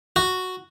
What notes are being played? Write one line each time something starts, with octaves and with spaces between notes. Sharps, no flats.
F#4